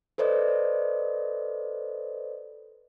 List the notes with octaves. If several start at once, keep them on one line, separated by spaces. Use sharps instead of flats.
A4 B4 C5 D5 D#5